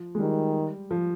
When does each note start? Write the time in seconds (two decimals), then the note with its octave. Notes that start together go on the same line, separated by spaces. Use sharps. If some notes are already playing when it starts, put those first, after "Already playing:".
Already playing: F3
0.15 G#3
0.19 D#3 G3
0.91 F3